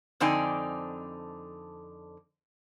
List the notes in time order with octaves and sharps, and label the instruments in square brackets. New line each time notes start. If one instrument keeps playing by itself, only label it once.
[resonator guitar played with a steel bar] F2 D3 C4 D#4 D5 G#5